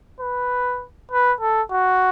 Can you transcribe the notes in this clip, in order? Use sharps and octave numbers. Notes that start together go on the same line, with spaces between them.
B4
B4
A4
F#4